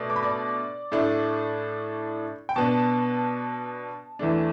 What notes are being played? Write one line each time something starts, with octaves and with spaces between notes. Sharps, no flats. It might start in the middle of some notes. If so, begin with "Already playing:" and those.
Already playing: B2 A3 D4
D6
B5
D5 D6
A2 A3 D4
G5
B2 B3 D4 A5
E2 E3 A3 D4